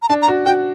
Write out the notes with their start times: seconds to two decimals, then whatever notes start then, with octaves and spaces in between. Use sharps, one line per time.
0.02 A#5
0.09 D4 A5
0.22 A#5
0.28 F#4
0.45 F#4 G5